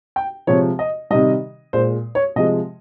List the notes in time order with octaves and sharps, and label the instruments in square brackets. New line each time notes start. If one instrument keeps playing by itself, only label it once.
[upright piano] G5
C3 F3 G#3 C#5
D#5
C3 D#3 G3 D#5
A#2 G#3 C5
C#5
C3 F3 G#3 D#5